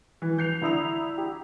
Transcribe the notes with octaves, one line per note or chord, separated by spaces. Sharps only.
E3
E3 G6 C7 F7
D3 E4 A#5 D#6 E6 F7
G4